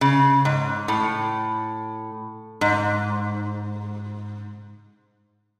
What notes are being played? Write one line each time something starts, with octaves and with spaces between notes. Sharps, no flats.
C#3
G#2
A2
G#2